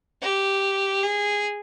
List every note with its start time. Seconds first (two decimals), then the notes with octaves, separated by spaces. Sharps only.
0.21 G4
1.02 G#4